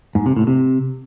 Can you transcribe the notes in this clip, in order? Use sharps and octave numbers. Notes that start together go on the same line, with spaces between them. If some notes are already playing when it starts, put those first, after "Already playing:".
G#2
C3
A2
C3